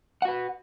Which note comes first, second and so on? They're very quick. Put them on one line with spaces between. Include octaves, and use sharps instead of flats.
F#5 F#4 B4